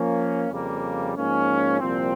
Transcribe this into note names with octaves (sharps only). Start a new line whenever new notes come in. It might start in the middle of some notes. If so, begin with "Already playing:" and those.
Already playing: F3 A#3 C#4
F2 C#3 G3 A#3
G#2 F3 A#3 C#4
C2 A#2 F3 C4